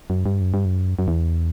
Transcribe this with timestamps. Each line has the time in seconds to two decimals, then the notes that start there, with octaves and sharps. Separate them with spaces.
0.10 F#2
0.26 G2
0.41 F#2
0.54 G2
0.65 F#2
0.99 F#2
1.08 E2